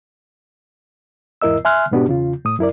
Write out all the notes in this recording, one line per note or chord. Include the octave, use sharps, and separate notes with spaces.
E2 G#2 E4 A#4 D#5 E6
E5 G#5 C6 F6 F#6
G#2 B2 B3 D4 F#4 G4
E2 C#3 F4
A2 D#6
F#2 E4 A#4 D5